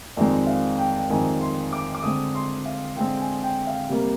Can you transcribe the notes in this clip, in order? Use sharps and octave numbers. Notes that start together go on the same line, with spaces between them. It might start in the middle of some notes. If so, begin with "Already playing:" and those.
F2 D#3 G#3 C4 D5
F5
G5
F2 D#3 G#3 C4 G#5
C6
D6
D6
D3 G#3 C4 D#6
C6
F5
D3 G#3 C4 G5
G#5
G5
F5
C3 G3 A#3